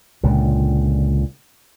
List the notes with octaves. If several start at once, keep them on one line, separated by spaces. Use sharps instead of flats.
C#2 A#2 D3